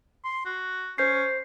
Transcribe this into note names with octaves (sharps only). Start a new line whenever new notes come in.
C6
F#4
C#4 C5 G6 C7